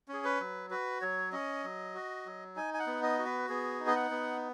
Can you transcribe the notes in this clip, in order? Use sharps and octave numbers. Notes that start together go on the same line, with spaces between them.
C#4
G#4
B4
F#3
F#4 B4
F#3 C#5
C#4 D#5
F#3
F#4
F#3
D#4 G#5
G#5
F#5
B3
D#5
F#4
B4
B3 G#4
D#4
D#5
F#5
B3